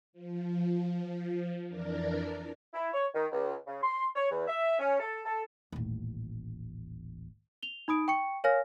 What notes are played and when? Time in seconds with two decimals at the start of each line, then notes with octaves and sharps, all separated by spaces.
0.13 F3
1.69 F2 E3 D4 A#4 D5
2.73 E4
2.92 C#5
3.15 D#3
3.32 C#2
3.67 C#3
3.83 C6
4.15 C#5
4.31 E2
4.48 E5
4.79 C#4
4.99 A4
5.25 A4
5.72 D#1 A1
7.63 F7 G7
7.88 D#4 B5 D#6 D7
8.08 G5 C#6 C#7
8.44 A#4 C#5 F5 G#5 F6 A#6